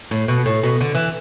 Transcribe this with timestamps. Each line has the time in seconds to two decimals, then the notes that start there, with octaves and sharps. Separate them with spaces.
0.11 A2
0.28 B2
0.46 A2
0.63 B2
0.81 D3
0.95 E3